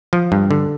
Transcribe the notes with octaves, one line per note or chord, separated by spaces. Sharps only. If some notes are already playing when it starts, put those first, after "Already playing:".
F3
G2
D3